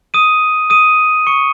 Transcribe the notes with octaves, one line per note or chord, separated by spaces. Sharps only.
D#6 D#7
D#6 D#7
C#6 C#7